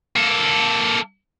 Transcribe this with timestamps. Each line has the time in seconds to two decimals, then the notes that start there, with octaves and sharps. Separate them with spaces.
0.16 A#3 A4